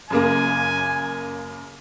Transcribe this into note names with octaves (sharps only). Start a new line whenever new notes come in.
F#2 C#3 A#3 G#5